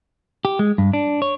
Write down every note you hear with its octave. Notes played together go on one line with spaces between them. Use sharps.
G4
G#3
G2
D4
C#5